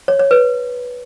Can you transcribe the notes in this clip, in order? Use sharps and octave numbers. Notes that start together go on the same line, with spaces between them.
C#5
C#5
B4